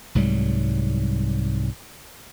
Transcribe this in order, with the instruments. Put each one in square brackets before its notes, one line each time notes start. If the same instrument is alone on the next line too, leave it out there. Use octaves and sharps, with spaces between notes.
[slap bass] C2 G#2 F#3 G3